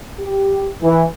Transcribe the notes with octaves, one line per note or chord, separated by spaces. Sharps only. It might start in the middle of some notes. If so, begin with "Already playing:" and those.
G4
E3